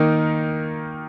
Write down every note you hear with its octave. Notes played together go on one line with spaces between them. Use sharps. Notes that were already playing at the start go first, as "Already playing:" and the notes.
Already playing: D#3 A#3 D#4 A#4